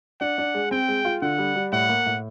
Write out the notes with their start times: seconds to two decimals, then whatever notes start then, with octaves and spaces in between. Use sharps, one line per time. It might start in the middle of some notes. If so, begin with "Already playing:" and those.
0.21 D4 F#5
0.38 D4
0.55 G#3
0.71 C4 G5
0.88 G#3
1.05 F4
1.22 D3 F#5
1.38 G3
1.56 G3
1.72 A2 F#5
1.89 A#3
2.06 A2